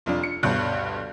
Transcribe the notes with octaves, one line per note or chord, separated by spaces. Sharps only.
F1 F2 F3 D4
C#7
D2 G2 B2 C#5 F#6 G6